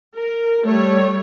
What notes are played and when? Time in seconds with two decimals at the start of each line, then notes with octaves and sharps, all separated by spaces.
0.14 A#4
0.64 G3 A3 C#5